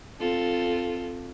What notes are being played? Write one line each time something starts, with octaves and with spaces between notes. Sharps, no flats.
C4 F4 A4